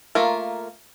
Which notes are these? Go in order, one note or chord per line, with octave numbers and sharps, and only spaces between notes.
A3 A#3 F4 A#4